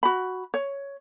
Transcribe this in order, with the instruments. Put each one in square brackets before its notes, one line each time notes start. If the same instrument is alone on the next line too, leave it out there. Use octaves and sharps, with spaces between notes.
[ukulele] F#4 B5
C#5